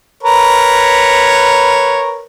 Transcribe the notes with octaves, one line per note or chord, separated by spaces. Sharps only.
A#4 B4 C#5